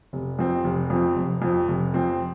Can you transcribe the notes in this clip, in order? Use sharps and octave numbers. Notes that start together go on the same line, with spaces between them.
F1
F2 F3 C4
F1
F2 F3 C4
F1
F2 F3 C4
F1
F2 F3 C4